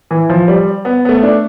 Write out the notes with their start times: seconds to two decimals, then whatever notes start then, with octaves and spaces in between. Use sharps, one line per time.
0.11 E3
0.29 F3
0.48 G3
0.85 B3
1.05 B3
1.09 A3
1.23 D4